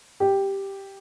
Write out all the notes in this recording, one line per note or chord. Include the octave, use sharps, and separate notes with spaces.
G4